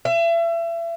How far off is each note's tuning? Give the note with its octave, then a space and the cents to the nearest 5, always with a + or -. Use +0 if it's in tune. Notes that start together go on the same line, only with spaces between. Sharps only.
E5 +35